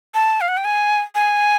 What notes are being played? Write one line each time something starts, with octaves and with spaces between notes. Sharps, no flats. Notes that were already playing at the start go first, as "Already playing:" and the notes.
A5
F5
F#5
G5
G#5
G#5